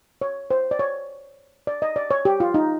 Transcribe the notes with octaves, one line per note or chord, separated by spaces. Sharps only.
C#5
C5
D5
C#5
D5
D#5
D5
C#5
G4
F4
D#4